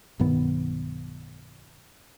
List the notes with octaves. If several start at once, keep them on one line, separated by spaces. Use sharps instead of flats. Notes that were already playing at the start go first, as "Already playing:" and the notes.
B1 G2 D#3 B3